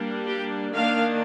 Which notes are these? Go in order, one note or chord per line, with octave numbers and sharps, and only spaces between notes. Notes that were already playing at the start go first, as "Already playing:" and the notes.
Already playing: G3 A#3 D4
G4
D#3 A#3 D4 F5